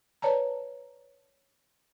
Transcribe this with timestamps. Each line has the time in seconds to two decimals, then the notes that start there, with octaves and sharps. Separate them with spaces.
0.22 B4 C#5 D5 A5 A#5